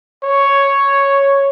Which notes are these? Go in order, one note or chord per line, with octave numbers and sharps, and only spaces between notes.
C#5